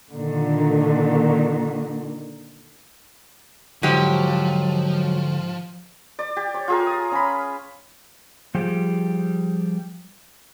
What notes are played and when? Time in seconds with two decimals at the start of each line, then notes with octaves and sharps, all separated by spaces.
0.12 A#2 D3 D#3
3.83 G#2 D3 F3 F#3 G4
6.19 D5
6.36 G4
6.54 C#5
6.68 F4 G#4 A#4
6.87 D#6
7.11 C#4 B5
8.55 F3 G3 G4 G#4